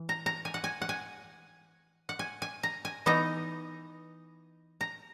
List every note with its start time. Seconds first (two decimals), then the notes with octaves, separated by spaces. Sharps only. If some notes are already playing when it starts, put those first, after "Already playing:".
Already playing: E3
0.09 A#5
0.26 A#5
0.45 G#5
0.54 F#5
0.64 G#5
0.82 F#5
0.89 G#5
2.09 F#5
2.19 G#5
2.42 G#5
2.63 A#5
2.85 G#5
3.06 E3 B3 D#4 A#5
4.81 A#5